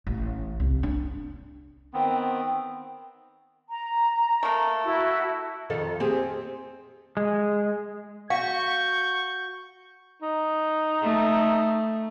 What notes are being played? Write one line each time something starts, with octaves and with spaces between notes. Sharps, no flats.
A1
C2
D4
D#3 B3 C4
A#5
A3 A#3
E4 F#4
F2 D#3 A4
C4 G4 G#4
G#3
F#4 F5 C#6 G6
D#4
A3